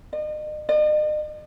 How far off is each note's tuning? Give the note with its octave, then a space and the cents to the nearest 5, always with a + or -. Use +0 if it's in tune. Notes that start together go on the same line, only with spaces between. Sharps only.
D#5 -40
D#5 -45